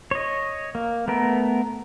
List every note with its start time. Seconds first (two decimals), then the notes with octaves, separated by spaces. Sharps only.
0.11 C#5 D#5
0.75 A#3
1.08 A3 B3 A#4